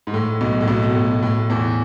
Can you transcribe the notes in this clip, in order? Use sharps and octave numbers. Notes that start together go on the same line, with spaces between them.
G#2
A2
B1 B2
A2
B1 B2
B2
A2
A2
E2 E3